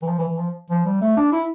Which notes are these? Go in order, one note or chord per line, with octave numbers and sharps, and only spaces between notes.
E3
F3
E3
E3
F3
F3
G3
A3
D4
E4